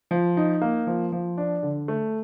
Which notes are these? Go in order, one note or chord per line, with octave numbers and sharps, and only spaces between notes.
F3
D#4
A#3
F3
F3
D4
D3
A3